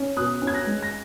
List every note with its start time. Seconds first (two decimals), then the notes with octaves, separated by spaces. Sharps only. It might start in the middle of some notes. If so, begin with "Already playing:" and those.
Already playing: C#4
0.17 B2 D#6 F#6
0.42 C#4
0.47 G#6
0.54 F#6 A#6
0.67 G#3
0.83 A#6